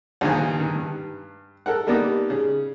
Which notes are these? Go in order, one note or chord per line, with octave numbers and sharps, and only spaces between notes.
A#1 G2 D#3 G#5
D#3
G2
A4 A#4 F#5
G3 A#3 B3 D4 D#4 G4
C#3